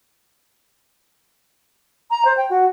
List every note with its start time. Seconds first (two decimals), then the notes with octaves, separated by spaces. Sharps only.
2.11 A#5
2.25 C5
2.37 G5
2.50 F#4